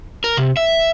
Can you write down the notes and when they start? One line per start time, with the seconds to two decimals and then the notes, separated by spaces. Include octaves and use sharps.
0.24 A#4
0.37 C3
0.57 E5